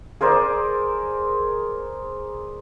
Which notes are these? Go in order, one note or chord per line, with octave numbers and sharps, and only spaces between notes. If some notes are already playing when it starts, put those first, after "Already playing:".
G#4 A#4 C5 D5